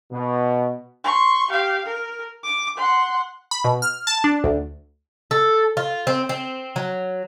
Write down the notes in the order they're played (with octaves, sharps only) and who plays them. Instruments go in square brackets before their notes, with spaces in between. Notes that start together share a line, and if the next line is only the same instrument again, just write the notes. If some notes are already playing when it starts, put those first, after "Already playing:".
[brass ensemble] B2
[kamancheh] C6 C#6
G4 F5
A#4
D6
F#5 C6
[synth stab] B5
B2
F6
A5
D4
D2
[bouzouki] A4
F4
C4
C4
F#3